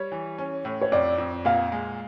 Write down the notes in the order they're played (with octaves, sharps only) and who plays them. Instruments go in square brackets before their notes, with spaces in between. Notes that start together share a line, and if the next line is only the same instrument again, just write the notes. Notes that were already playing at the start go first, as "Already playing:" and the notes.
Already playing: [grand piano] G3 [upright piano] C#5
[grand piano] E3
C#4
A2
[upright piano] C#5
[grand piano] F2 [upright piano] D5
[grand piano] F2
[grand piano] A#2 [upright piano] F5
[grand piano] G#3